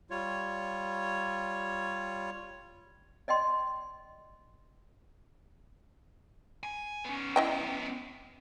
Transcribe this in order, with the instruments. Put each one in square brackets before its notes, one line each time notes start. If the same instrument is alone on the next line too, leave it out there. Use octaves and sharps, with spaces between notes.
[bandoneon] G3 F4 C#5
[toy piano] D5 D#5 G5 C6
[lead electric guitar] G#5
B3 C#4
[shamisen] E4 D#5 G5